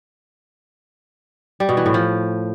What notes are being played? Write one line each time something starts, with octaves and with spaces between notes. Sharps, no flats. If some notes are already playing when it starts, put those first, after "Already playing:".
G3
B2
E3
A2
F3